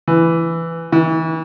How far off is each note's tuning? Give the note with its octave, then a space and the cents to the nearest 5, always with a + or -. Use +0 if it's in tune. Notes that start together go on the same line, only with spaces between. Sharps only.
E3 +10
E3 -30